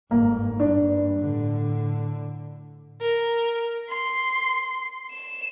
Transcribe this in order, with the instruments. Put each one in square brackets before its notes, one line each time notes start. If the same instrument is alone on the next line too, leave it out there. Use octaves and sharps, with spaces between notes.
[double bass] G1 G#2 [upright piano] A#3
[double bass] G2 [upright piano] D4
[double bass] A2 D3
[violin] A#4
C6
E7